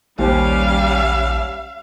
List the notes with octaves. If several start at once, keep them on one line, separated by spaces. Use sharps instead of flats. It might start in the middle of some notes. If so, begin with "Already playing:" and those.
A#1 D#2 G3 C#4 C5 F5